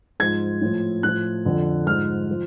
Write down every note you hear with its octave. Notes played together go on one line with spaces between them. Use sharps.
G#2 F3 G#6
A2 F3
A2 F3 F#6
F2 D3 F3
G#2 F3 F6
F3